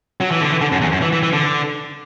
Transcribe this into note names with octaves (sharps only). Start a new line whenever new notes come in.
F#3
E3
D3
E3
D3
F#2
E2
F#2
E3
E3
E3
D3